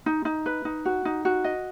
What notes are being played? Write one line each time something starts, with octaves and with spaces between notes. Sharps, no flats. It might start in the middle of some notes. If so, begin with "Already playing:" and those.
D#4
D#4
B4
D#4
F#4
D#4
F#4
D#5